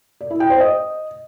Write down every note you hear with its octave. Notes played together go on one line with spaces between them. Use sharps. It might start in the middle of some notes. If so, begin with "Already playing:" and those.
D5
E4
G5
C5
D#5